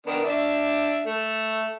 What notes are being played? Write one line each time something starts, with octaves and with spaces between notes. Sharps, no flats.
D#3 B3 D4
D4 D5 E5
A3